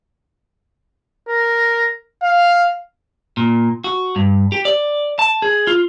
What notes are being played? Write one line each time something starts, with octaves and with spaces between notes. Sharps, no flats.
A#4
F5
A#2
F#4
G2
G4
D5
A5
G#4
F4